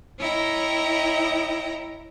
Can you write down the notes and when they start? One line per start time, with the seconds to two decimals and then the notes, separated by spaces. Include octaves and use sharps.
0.18 E4 C#5 D#5 G5 A#5